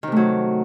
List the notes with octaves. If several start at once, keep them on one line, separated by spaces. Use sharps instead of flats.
C3 D#3 F#3 A3